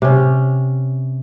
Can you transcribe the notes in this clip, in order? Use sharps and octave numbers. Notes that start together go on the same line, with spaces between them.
C3 C#4